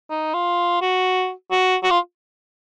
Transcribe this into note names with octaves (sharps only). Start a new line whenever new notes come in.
D#4
F4
F#4
F#4
F#4
F4